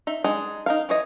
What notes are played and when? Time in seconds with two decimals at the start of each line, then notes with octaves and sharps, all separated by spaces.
0.07 D#4 E5
0.24 G#3 D4 D#4 G#4
0.66 D#4 A#4 F5
0.89 E3 C#5 D#5